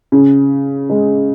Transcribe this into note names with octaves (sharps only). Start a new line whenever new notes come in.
C#3
G#3